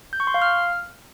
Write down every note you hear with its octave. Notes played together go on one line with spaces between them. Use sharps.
G6
C#6
C6
F5
F6